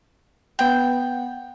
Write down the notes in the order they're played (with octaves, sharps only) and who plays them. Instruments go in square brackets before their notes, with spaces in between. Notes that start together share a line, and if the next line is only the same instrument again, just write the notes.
[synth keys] B3 F#5 [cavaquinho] G5